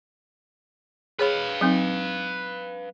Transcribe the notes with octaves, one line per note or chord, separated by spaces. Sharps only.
G#4 B4 C#5 F5 B5
F#3 C4 D#4